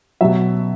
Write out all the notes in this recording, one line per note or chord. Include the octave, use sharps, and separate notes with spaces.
B2 F#3 E5